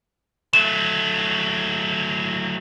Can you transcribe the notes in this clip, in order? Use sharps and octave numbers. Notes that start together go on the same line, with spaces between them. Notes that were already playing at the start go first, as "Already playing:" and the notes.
F#3 A3 E7